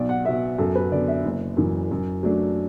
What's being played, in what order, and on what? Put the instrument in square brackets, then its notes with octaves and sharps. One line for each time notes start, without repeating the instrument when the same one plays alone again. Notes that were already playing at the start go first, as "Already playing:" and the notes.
Already playing: [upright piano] B1 D5
F#5
B2 B3 E5
F#2 A4
B4
D3 B3 D5
E5
F#1
F#2 E3
F#2
F#3 A3 D4